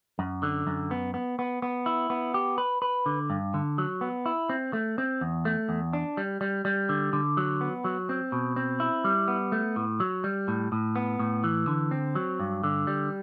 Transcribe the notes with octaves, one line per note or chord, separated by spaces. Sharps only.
F#2
D3
F#2
B3
B3
B3
B3
E4
B3
G4
B4
B4
D3
G2
D3
F#3
B3
E4
C4
A3
C4
E2
A3
E2
D4
G3
G3
G3
D3
D3
F#3
B3
F#3
C4
B2
C4
E4
G3
B3
A3
A2
F#3
G3
A2
A2
B3
A2
E3
D3
C4
F#3
G2
D3
G3